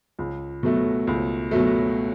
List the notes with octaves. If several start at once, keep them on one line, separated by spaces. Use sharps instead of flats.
C#2
B2 F#3 A3
C#2
B2 F#3 A3